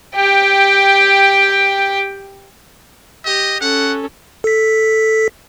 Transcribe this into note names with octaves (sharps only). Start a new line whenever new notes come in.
G4 G5
G4 D#5
C#4 A4 F#5
A4 B6